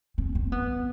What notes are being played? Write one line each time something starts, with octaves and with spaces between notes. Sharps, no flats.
C4
C4
B3